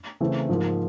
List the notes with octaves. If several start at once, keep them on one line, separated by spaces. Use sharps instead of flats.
C#3 E3 A3 C4
G#2 F3 A#3